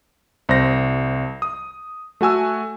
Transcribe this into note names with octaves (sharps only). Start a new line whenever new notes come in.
C2 C5 A#6
D#6
A3 F#4 G#5 E6